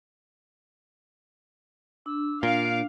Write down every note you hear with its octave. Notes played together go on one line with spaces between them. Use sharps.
D4 E6
A#2 F5 D7